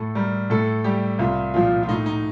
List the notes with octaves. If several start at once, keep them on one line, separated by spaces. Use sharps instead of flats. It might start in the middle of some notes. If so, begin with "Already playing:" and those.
Already playing: A2 A4
G3 A#4
A2 A4
G3 G4
C2 F4
A#2 F3 F4
F4
A2 D#4
D#4